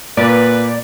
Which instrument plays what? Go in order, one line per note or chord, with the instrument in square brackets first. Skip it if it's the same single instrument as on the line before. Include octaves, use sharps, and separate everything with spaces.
[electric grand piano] A#2 [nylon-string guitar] A#3 [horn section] B4 [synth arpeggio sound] D5